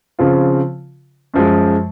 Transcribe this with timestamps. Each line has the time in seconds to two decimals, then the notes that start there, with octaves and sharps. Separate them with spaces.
0.19 C#3 F3 C4 F4
1.34 F#2 F3 G#3